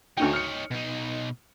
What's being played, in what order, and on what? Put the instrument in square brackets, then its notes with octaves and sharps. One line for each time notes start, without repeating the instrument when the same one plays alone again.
[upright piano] D2 D3 G5 [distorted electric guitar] D#4 C#5
[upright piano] F6 C#7
[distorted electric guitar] B2 D#4